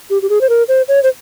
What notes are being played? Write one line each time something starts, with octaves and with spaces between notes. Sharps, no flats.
G4
G4
G#4
C5
A#4
C5
C#5
C5